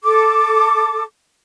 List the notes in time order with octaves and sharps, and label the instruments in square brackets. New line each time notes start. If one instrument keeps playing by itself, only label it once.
[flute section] A4 D6